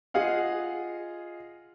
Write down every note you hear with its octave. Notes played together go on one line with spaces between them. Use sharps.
F4 G#4 D#5 F5 F#5